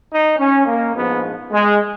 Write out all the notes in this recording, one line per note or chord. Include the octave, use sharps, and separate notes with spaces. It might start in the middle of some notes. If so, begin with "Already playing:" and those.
D#4
C#4
A#3
A#1 G#2 F3 B3
G#3